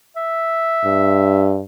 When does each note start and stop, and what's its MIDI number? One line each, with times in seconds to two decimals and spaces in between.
0.16 1.57 76
0.85 1.62 43